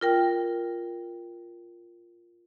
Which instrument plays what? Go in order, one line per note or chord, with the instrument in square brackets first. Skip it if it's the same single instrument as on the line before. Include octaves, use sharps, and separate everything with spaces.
[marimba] F4 A#4 G5